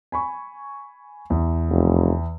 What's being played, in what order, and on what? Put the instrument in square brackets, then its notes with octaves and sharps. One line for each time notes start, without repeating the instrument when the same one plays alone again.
[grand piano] G#5 B5 C#6
E2
[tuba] F1